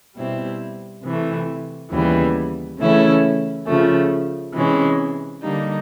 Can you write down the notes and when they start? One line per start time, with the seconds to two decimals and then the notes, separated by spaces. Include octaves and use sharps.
0.16 B2 G3 C4 E4
1.04 C3 E3 A3
1.91 D#2 C#3 E3 G3 B3
2.78 C#3 E3 A3 C#4 E4
3.66 C#3 F3 A3
4.54 C3 E3 G#3 C#4
5.41 D3 G3 A#3 D#4